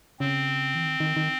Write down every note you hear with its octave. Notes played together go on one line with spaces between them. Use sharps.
C#3 C4
E3
D#3
D#3
D#3